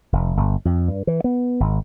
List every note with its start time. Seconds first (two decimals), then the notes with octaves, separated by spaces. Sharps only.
0.13 F1
0.37 G1
0.65 F2
0.88 G2
1.07 E3
1.24 B3
1.60 G#1